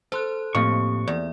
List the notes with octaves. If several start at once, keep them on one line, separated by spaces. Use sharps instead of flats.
A4 C5 C6 F#6
A2 F3 A#3 C4 G4 C#6
E2 D5